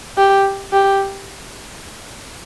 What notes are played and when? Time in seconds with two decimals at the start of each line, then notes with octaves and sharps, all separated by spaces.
0.18 G4
0.73 G4